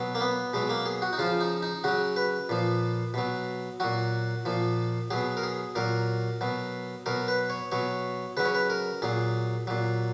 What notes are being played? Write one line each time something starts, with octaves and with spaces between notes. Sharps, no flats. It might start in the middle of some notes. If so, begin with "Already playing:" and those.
Already playing: B2 F#3
A#3
B3
B2 F#3 G#3
A#3
G#4
F#4
D#4
C#3 F3 F4
D#4
D#4
C#3 F#3 F#4
B4
A#2 F3
B2 F#3
A#2 F#3 F#4
A#2 F3
B2 F#3 G#4
A#4
G#4
A#2 F#3 A#4
B2 F#3
B2 F#3 A#4
B4
C#5
B2 F#3 C#5
C#3 F#3 B4
C#5
B4
A#4
A#2 F#3 G#4
A#2 F#3